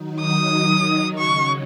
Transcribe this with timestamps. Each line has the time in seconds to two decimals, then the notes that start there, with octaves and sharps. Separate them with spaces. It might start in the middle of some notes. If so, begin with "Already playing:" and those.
Already playing: D#3 F#3 D#4
0.21 D#6
1.18 C#3 F#3 C#4 C#6